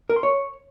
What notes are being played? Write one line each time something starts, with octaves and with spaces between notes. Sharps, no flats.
A#4
C6
C#5